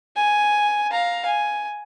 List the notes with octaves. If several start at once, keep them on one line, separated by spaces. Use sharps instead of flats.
G#5
F5 A#5
G#5